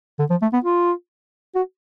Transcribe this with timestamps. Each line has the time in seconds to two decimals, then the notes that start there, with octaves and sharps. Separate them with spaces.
0.19 D3
0.30 F3
0.42 A3
0.53 B3
0.64 F4
1.55 F#4